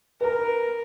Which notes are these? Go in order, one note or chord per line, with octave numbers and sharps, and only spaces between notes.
A#4 B4 A#5